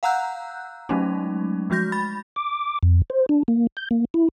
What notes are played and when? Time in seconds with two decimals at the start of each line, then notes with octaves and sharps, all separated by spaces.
0.03 F5 F#5 A#5 E6 F#6 G6
0.89 F#3 G#3 A3 C#4 D#4
1.70 F3 G#3 F#4 G6 A#6
1.92 B5 A6
2.36 D6
2.83 F2
3.10 C5
3.29 D4
3.48 A#3
3.77 G6
3.91 A#3
4.14 E4